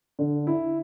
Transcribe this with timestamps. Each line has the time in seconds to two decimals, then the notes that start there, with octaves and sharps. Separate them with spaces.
0.19 D3
0.47 E4